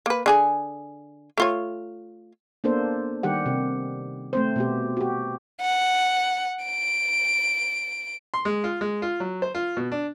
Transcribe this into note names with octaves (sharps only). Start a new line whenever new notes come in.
A#3 B4
D3 G#4 G#5
A3 F4 C#5
A#3 B3 D4 A4 C5
D#3 G3 G4 F#5
C3
A3 C4 C5
B2 B3 G4
F#4 G4
F#5
D7
C6
G#3
F4
G#3
F4
F#3
C5
F4
B2
D4